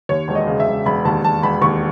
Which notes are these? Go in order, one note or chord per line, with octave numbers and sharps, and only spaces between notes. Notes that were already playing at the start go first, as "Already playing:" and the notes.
D#2 C#5
E1
D#5
C#3
E5
E1
E1 B5
D#2 A5
E1 A5
E1 B5
D#2 C#6